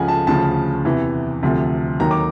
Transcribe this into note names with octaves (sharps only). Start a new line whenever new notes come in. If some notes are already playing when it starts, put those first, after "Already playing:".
Already playing: C#2 C#3 F3 F#5 G#5
A5
D2 C#3 F3 A5
E2 C3 E3
D2 C3 F3
D#2 D#3 F#3 A#5
D6